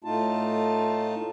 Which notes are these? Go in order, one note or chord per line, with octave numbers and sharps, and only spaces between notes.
A2 A3 D#4 F4 A5